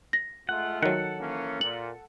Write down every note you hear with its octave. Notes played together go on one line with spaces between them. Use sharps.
A#6
G#3 A3 F4 F#5
D#3 F#3 A4 F#5
E3 A#3 C#4
A#2 F#7